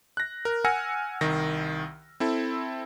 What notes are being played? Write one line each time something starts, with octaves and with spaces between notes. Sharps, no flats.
F#6 A#6
A#4
F#5 G#5 E6 F6 A#6 C#7
C2 D#3 A#6
C4 E4 A4